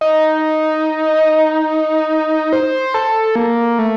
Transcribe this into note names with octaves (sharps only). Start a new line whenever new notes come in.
D#4
C5
A4
A#3
A3